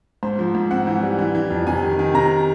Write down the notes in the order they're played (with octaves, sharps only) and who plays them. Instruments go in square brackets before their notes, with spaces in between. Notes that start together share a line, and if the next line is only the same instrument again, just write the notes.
[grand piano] G#2 C5
F3
G#2
C4 F#5
E3
G3
E3
E3
F2
C3 G#5
D#3
D#3
C3 A#5